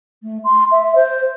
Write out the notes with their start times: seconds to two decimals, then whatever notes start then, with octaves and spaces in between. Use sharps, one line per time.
0.23 A3
0.44 C6
0.71 E5
0.95 C5